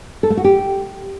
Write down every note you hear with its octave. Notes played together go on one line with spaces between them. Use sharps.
A4
A3
F#4
G4